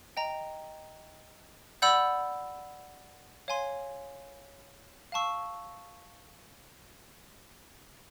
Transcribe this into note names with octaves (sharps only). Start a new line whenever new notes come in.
D#5 G5 A#5
D5 F#5 B5 E6 G6
C#5 F5 G#5 C6
F5 A5 C#6 E6